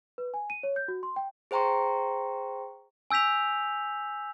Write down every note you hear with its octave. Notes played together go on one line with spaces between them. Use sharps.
B4
G#5
D#7
C#5
G6
F#4
C6
G5
G#4 C5 G5 A#5 C6 C#6
G#5 E6 G6 B6 F7